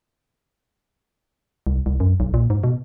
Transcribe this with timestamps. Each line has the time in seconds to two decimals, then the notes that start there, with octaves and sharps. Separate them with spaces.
1.67 C2
1.86 C2
2.00 F#2
2.20 B1
2.34 A#2
2.50 G#2
2.64 B2